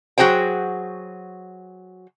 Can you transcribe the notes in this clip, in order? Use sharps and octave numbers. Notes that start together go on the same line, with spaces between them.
F#3 F#4 G#4 C5 G5